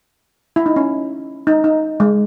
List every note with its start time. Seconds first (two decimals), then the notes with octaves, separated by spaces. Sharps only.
0.56 E4
0.66 D#4
0.76 C#4
1.47 D#4
1.64 D#4
2.00 G#3